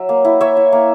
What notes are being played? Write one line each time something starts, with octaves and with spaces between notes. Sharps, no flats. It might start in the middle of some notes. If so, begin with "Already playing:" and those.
Already playing: F#3 E5
A#3
E4
A#3 C#5 E5
E4
A#3